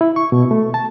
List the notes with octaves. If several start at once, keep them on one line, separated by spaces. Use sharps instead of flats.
E4
C#6
B2
A3
A5